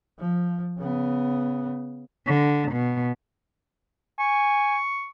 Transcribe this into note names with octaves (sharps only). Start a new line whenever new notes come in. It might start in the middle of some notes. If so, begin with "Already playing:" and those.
F3
C#3 B3
D3
B2
G#5 C#6